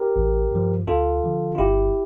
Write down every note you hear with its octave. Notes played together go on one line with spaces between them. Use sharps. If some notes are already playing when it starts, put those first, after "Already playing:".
Already playing: G4 A#4
A1
G2 F3
D2 F4 A4
D3 F3
F4
G1 E4 G4